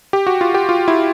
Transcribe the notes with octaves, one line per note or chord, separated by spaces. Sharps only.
G4
F#4
F4
G4
F4
E4